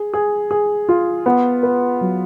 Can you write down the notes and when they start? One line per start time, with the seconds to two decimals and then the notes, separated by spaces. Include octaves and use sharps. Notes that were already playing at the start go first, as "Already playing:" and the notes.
Already playing: G#4
0.14 G#4
0.51 G#4
0.89 F4
1.26 B3
1.63 B4
2.01 F#3